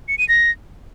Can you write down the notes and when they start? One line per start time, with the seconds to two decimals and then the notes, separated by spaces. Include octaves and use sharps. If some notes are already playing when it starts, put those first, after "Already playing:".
0.08 C#7
0.18 D#7
0.29 A#6